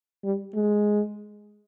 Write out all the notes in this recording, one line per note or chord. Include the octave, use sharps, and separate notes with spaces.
G3
G#3